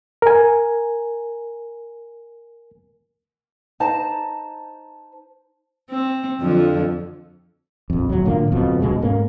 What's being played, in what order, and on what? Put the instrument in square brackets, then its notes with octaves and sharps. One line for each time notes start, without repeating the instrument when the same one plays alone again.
[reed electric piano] A#4 G#5
[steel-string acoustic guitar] D#4 C5 A5 A#5
[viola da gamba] C4
F2 D3 F3
[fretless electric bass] A#1 F2
D1 F#3
A2 D3 F3 A#3
D1 F2 B2 F3
D1 D2 B2 G#3
G#2 A3 A#3 C#4